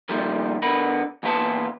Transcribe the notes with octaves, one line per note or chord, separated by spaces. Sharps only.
F2 A#2 D#3 G3 A3
D3 B3 A#4 B5
E2 A#2 F4 B4 A5